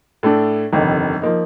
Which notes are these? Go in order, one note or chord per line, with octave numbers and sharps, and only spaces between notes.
A2 A3 D4
G1 F2 C3 D#3
F3 A#3 D#4